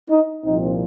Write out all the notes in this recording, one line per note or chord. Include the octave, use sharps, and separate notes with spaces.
D#4
C2 A#2 F3 C4 D#4